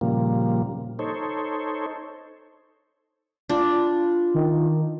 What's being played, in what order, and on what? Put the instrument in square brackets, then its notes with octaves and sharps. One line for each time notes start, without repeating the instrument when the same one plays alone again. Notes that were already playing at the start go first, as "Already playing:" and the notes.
[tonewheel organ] A#2 C#3 F3 G3 A#3
D#4 A4 C5 C#5
[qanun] D4 [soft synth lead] F4
[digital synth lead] D#3